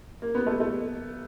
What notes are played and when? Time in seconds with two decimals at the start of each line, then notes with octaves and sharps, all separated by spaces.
0.22 A#3
0.35 B3
0.47 A3
0.60 A3